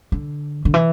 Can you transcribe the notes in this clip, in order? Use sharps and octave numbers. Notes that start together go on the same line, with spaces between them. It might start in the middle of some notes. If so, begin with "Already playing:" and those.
D3
D3
E3